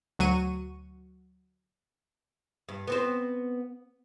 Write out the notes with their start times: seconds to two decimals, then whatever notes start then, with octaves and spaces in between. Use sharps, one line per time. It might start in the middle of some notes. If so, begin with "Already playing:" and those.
0.19 D2 F#3 C#6 D#7
2.69 G2
2.87 B3 C4 C5